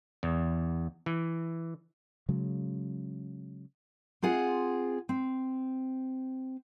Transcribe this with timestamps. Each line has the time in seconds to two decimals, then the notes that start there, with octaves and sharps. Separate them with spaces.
0.23 E2
1.06 E3
2.29 C#3 F#3 G#3
4.22 C4 F4 G#4 F#5
5.09 C4